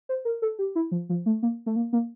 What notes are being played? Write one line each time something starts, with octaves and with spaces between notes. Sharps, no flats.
C5
A#4
A4
G4
E4
F3
F3
A3
A#3
A3
A#3
A#3